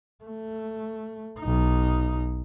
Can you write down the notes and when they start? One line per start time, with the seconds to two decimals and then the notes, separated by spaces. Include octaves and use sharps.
0.24 A3
1.40 B1 D#4